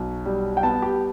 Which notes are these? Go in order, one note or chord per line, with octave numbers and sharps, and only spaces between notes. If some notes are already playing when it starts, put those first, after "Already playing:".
Already playing: B1
G3
G5
B3 A5
G4